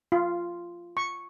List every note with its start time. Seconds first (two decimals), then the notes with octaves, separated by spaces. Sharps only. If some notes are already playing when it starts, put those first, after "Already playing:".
0.12 F4
0.97 C#6